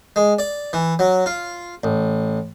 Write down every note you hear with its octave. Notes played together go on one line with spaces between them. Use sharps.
G#3
D5
E3
F#3
F4
A1